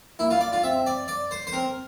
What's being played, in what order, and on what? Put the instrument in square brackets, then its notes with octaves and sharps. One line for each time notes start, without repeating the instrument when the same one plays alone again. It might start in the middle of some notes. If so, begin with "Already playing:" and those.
[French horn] A#3 [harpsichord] E4
[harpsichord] F4
D5
F4
[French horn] C4 [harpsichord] E5
[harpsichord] D5
D5
C5
C5
[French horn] C4 [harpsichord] A#4